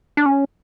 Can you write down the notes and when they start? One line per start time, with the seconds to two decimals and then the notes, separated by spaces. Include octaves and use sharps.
0.17 D4
0.26 C#4